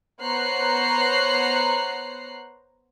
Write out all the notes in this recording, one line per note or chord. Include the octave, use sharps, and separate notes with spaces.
B3 C5 C#5 A#5 F#6 C7